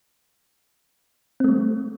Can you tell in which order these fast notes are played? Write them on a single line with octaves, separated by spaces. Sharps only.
C4 A3 G3